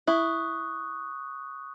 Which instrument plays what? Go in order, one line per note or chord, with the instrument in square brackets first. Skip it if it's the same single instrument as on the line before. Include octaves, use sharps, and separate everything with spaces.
[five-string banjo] E4 [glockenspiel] C#6 D#6 F#6